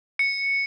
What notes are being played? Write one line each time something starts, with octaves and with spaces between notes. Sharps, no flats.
C#7